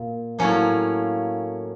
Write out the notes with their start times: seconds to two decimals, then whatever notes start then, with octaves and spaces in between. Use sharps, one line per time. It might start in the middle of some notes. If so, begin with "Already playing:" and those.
Already playing: A#2 A#3
0.39 A2 F#3 A#3 C#4